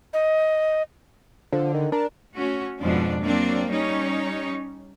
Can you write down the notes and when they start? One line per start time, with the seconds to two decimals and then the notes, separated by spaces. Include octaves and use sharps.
0.13 D#5
1.53 D3 F3
1.74 D#3
1.92 D4 A#4
2.34 A3 C#4 F#4
2.82 F2 G#2 B2 F3 D4
3.23 F#3 A#3 C4 D4 D5
3.71 G3 C#4 D#4 C#5